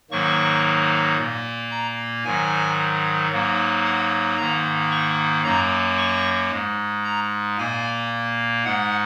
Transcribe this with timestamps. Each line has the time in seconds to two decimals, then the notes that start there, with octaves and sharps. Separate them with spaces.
0.11 G#2 D#3 F#3 A#3 C#6
1.18 A#2 A#3
1.71 A#5
2.24 G#2 D#3 F#3 G#5
3.31 G#2 F#3 A#3
3.85 F#5
4.37 G#2 D#3 A#3 A#5
4.91 C#6
5.44 F#2 F#3 A#3 A#5
5.98 C#6
6.51 G#2 G#3
7.04 A#5
7.58 A#2 A#3 G#5
8.64 G#2 G#3 F#5